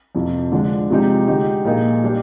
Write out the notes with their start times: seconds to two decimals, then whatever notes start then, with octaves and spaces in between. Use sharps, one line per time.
0.15 F2 C3 F3
0.52 D3 F3 G#3 D4
0.90 C3 F3 G#3 D#4 G4
1.28 D3 G#3 D#4 G4
1.65 A#2 F3 A#3 D#4 G#4
2.04 G3 D4 G4